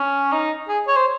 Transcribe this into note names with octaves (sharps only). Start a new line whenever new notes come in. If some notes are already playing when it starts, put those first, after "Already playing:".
Already playing: C#4
D#4
G#4
C#5
C5